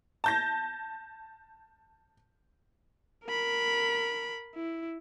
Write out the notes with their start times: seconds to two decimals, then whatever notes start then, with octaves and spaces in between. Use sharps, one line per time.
0.24 A5 G6 A#6
3.27 A#4 B5
4.55 E4